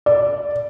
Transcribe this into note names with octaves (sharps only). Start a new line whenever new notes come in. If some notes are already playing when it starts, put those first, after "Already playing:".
D5